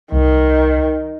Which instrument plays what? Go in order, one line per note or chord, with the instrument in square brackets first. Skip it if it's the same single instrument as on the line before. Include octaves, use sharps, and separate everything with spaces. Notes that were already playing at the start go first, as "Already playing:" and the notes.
[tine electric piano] C2 [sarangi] D#3